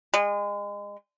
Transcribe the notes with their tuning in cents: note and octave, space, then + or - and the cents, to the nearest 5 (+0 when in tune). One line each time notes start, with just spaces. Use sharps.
G#3 -30